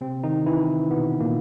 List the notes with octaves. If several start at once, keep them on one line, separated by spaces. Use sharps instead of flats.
C3 C4
D#3 D#4
E3 E4
B2 B3
A#2 A#3